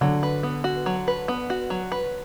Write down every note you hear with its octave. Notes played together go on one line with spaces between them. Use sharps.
D3 F#3
B4
B3
F#4
F#3
B4
B3
F#4
F#3
B4